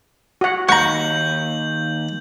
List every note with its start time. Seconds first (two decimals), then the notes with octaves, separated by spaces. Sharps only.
0.41 F#4 F#5
0.69 D#2 F#5 A#5 C#6 G6 F#7